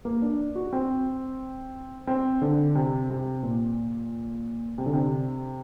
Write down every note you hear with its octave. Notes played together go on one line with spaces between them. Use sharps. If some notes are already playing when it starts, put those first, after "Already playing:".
A#3
D4
F#4
C4
C4
D3
C3
C3
A#2
C3
D3
C3